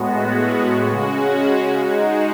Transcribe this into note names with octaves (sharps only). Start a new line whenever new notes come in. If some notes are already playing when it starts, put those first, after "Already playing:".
Already playing: A2 G#3 B3 F#4
C#3 G#3 C#4 F#4
G#3 D#4 F#4